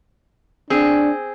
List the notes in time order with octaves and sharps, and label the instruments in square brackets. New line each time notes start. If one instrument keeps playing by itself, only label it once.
[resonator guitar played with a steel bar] C4 G#4 [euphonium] D4